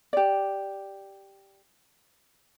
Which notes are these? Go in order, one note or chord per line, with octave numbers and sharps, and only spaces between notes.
G4 D5